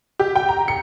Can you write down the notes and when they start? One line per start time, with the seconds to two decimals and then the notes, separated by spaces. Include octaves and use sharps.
0.20 G4
0.36 G5
0.49 A#5
0.68 C#7